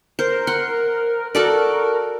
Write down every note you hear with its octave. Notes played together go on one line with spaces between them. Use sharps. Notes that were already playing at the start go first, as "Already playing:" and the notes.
A#4 C5
F#5 C6
F#4 A4 A#4 D5